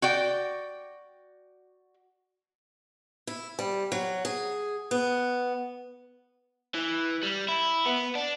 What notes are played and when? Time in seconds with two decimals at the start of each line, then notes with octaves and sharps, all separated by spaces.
0.02 F#4 D5 G5
3.27 E4
3.59 G3
3.92 F#3
4.25 G#4
4.91 B3
6.75 E3
7.23 G3
7.48 E4
7.86 B3
8.15 D4